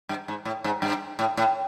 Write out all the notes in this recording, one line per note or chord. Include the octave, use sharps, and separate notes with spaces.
G2
G#2
A2
G#2
G2
A2
A2